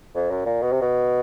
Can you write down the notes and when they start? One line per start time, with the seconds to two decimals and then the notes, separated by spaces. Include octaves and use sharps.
0.15 F2
0.31 F#2
0.46 A#2
0.62 B2
0.72 C3
0.82 B2